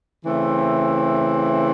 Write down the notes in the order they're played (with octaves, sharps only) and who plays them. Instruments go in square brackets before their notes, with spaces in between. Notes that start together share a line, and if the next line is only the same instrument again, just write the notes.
[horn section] C#3 E3 A3 C4